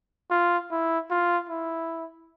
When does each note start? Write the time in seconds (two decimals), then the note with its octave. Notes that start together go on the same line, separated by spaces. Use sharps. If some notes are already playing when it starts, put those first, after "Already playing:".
0.30 F4
0.71 E4
1.10 F4
1.49 E4